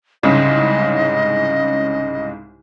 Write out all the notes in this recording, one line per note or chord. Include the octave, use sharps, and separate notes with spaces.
C2 G#2 C#3 D#5